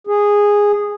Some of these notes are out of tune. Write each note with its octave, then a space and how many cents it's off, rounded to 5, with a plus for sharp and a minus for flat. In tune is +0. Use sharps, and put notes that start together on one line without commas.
G#4 -10